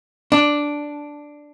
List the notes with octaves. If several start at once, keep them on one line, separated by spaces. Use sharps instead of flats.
D4